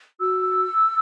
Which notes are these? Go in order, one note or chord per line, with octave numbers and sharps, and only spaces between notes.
F#4 E6